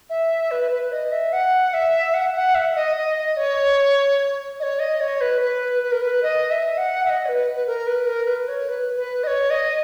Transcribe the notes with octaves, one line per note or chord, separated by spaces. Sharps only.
E5
B4
B4
D#5
E5
F#5
E5
F#5
F#5
E5
D#5
D#5
C#5
D#5
C#5
D#5
C#5
B4
B4
B4
A#4
B4
D#5
E5
F#5
E5
D#5
C#5
B4
B4
A#4
B4
A#4
B4
C#5
B4
B4
D#5
C#5
D#5